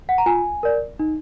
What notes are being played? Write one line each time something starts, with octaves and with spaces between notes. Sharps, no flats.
F#5
A#5
F4 G#5
A#4 D5
D#4